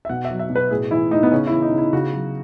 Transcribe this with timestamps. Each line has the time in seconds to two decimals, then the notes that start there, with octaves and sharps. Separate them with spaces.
0.05 E5
0.09 B2 F#5
0.25 E5
0.30 F#3
0.39 E5
0.50 B2
0.56 B4
0.71 A2 G#4
0.91 E3 E4
1.11 A2 D#4
1.23 B3
1.32 C#3 C#4
1.47 E3 E4
1.62 D#4
1.72 C#3
1.78 E4
1.93 C#3 F#4
2.13 F#3